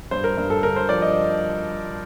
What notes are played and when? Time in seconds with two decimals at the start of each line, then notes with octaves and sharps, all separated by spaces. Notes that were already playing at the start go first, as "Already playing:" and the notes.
0.11 G2 C5
0.24 A#4
0.37 G2
0.50 A4
0.63 D3 A#4
0.76 C5
0.89 F3 D5
1.02 D#5